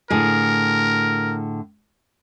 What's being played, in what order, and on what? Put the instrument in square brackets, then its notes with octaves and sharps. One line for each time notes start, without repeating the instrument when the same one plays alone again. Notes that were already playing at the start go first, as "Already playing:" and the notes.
[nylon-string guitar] A2 D3 G#4 [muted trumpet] A#4